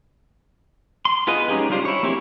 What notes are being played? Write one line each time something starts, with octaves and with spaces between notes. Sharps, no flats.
C6
B3 F4 G#4 B4 D#5
G#3 C#4 D#4 G4 G#4
G3 D4 F4 G4 C5
E4 C#5
A#3 C4 E4 G4 G#4